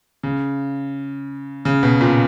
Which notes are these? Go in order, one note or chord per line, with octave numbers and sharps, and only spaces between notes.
C#3
C#3
B2
A#2